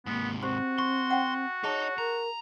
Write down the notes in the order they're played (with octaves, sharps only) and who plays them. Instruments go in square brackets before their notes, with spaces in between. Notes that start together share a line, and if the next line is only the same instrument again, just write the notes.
[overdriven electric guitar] G#2 C3 [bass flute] A#3 [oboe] B3
[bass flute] C4 [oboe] F#4 [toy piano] G4 C5 C6
[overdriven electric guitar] C6 [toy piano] C#6
[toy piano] F#5 G5
[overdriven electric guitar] D#4 D#5 [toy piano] G#4 A5 [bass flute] C#5
[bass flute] A#4 [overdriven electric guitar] A#5